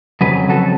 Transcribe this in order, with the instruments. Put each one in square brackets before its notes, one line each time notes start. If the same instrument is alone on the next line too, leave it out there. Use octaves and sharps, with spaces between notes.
[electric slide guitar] F2 C#3 F#3 G#4 B4
F#4 A4